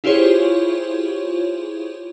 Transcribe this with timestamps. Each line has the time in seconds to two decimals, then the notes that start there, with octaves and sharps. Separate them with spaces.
0.04 E4 F4 G4 G#4 C5 C#5